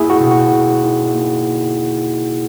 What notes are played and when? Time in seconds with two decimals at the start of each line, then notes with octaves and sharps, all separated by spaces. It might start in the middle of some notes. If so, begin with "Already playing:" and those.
Already playing: A#3 E4 G#4
0.10 F#4
0.20 B2
0.31 F#4
0.52 B2
0.83 D#4
1.15 A#3